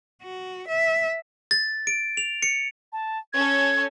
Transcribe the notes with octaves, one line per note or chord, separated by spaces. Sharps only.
F#4
E5
A6
D7
F7
C#7
A5
C#4 A4 G#6